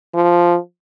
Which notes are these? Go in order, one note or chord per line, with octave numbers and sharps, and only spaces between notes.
F3